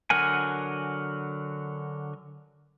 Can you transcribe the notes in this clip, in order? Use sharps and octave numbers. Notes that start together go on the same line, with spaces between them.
D3 F#3 A#4 F#5 G#5